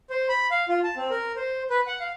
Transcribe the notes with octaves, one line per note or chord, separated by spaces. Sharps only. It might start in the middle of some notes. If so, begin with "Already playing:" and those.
C5
B5
F5
F4
A5
C4
A#4
C5
B4
F#5
F5